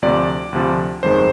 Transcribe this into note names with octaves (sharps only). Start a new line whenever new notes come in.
D2 C3 F3 D5
D2 C3 F3
G1 F2 D#3 G#3 C5